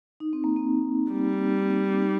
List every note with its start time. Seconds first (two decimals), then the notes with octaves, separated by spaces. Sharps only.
0.20 D#4
0.33 C4
0.44 A#3
0.56 C4
1.11 G3
2.02 D#4